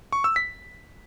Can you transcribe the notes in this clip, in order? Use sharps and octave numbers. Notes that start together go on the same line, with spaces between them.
C#6
E6
B6